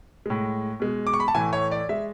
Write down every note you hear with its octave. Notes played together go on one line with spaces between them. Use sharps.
A2 G#3
B2 G#3
D6
C#6
B5
A5
A2 E3 A3 G#5
C#5
D5
G#3 E5